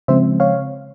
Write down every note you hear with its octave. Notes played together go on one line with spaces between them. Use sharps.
C#3 F3 G#3 C4 C5 E5
C#5 F5